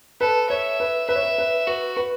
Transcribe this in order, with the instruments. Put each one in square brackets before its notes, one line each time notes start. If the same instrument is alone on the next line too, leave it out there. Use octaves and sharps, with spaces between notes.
[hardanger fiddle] A4 [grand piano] B4
[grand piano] C#5 [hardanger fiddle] E5
[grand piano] B4
[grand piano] B4 [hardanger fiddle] E5
[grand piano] C#5
B4
B4
[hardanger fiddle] F#4 [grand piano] B4
[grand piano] B4